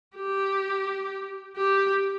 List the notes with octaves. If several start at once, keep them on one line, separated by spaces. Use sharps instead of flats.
G4
G4